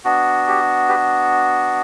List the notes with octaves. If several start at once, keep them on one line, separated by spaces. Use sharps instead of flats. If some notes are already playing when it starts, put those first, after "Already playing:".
B3 D4 F#4
G4
G4 B4